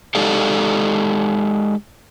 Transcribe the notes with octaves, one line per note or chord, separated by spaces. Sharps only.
G#3 D#4 G4 A4 D5 F5